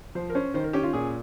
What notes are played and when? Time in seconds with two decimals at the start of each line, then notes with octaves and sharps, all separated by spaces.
0.15 F3 C5
0.30 A#4
0.35 C#4 C5
0.54 D#3 C5
0.64 A#4
0.73 C#4 G4
0.83 F4
0.93 A#2 G#4